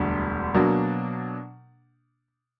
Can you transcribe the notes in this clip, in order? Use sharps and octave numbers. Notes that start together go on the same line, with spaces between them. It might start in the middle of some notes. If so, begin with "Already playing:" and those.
Already playing: E1 D2 D3 G3
B2 F#3 A#3 D4